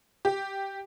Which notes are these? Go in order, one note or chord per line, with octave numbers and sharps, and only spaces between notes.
G4